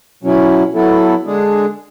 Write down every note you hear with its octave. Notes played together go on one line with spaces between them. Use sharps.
B2 F#3 C#4 E4
F#3 B3 E4 A4
D3 G#3 D4 G#4